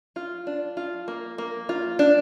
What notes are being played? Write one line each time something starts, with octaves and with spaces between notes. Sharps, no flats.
F4
D4
F4
A#3
A#3
F4
D4